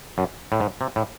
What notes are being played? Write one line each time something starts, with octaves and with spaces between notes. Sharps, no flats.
F#2
A2
G#2
C3
A2